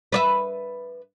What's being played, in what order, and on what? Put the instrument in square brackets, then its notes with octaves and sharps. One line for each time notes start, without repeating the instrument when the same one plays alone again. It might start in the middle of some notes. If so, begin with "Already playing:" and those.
[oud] B4 D5 E5